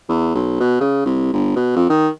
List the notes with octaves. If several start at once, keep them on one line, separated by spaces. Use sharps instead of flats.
E2
B1
B2
C#3
C2
G1
B2
F2
D#3